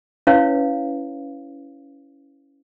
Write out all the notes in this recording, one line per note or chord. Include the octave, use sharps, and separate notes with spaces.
C#4 E4 B4 C#5 F5